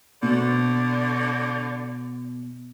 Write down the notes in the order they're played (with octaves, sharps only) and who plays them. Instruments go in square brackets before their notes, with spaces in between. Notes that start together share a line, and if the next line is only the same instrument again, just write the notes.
[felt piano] B2 [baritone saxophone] D3